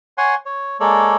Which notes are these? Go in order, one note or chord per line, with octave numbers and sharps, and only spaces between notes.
C#5 F#5 G#5 C6
C#5
G#3 A#3 A4 C#5 D5